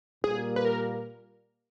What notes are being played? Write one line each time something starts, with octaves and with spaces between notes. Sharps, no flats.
A#2 G3 A#3 G#4
B4
A#4